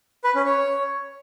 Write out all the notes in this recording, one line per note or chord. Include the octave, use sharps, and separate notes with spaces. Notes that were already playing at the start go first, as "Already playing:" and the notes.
B4
C#4
C#5